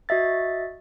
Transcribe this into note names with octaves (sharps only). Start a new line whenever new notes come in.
F#4 D#5 E5 A6